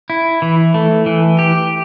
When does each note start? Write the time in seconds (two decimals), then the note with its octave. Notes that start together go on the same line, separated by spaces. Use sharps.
0.10 E4
0.42 E3
0.74 A3
1.06 E3
1.39 G4